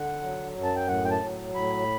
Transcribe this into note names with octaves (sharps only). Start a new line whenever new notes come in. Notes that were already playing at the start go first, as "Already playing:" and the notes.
Already playing: D3 F#5
F#3
F#2
A5
G5
A2 F#5
G5
A5
F#3
A2 B5